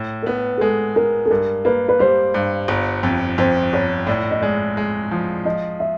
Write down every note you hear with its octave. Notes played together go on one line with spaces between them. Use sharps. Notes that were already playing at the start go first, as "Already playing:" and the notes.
Already playing: A2
A#4
B3 B4
G#4
G#3 A4
G#3 A#4
A4
G2 A#4
A#3 B4
B4
G3 C5
G2
G1
F2
F2 C5
G1 C#5
A2 D5
D#5
G#3 D5
G#3
F3
F3 D#5
E5